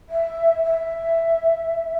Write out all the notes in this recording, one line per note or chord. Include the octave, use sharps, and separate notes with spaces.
E5
E5